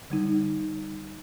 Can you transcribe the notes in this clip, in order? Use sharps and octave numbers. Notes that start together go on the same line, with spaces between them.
D3 G3 D#4